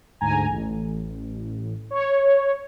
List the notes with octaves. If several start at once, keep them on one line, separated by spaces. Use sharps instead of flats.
D2 G#2 G#5 A#5
A1
C#5